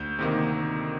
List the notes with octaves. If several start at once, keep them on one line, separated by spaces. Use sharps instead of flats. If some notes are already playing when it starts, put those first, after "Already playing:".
Already playing: D2 G6
C3 D#3 A#3